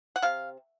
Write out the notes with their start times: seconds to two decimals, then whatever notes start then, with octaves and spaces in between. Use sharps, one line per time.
0.16 F#5
0.22 C3 F5